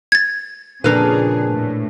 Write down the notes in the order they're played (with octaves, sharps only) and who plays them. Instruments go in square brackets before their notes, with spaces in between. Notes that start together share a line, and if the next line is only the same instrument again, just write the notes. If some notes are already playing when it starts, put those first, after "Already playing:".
[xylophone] G#6 A6
[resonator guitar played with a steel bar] F2 A#4 B4 [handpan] A#2 D4 [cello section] C#3 G#4
[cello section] A2